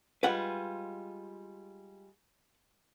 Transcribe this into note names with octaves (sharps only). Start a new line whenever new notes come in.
G3 G#3 F4 B4 F#5